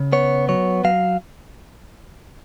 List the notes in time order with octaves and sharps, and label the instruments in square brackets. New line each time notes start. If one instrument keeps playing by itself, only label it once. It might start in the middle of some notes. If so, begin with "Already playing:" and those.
Already playing: [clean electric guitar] C#3
B3 C#5
F#3 C#5
F#3 F5